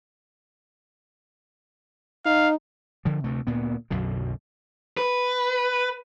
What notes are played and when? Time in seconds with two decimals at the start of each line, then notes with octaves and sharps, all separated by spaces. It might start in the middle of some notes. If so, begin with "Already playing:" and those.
2.26 D#4 F5
3.05 D3 F3
3.24 D2 C3 A3
3.47 D2 A#2 B3
3.90 B1 F#2 B2 D3
4.97 B4